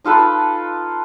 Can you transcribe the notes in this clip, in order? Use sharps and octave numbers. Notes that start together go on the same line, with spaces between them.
D#4 F4 A4 B4